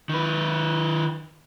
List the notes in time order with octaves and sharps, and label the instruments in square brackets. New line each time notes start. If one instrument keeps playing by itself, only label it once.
[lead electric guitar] D#3 B4